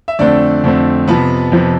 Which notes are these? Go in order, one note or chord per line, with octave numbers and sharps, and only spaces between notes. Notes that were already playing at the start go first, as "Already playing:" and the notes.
E5
F2 D3 A3 C4 D4 D5
F2 D3 A3 C4
F2 C3 F3 B3 B4
F2 C3 F3